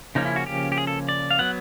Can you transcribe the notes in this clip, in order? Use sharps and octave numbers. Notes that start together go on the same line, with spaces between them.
C#3 F3 A#3 C#4 D#4
E4
F#4
G4
G4
G#4
A4
D5
F5
F#3 B3 F#5